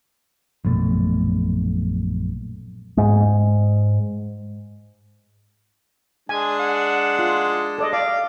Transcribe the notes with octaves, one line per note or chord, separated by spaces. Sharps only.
A#1 F#2 B2 A3
G#2 G#3
G#3 D4 G#5
F#5
F4
A4 D5 D#5
D5 F5